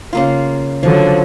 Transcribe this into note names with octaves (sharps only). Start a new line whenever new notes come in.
C#3 A#3 F4
D3 F3 F#3